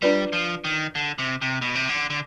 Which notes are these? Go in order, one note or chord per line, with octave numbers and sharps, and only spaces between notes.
G3 D4 F4 B4 D5
F3
D#3
D3
C3
C3
B2
C3
D3
D3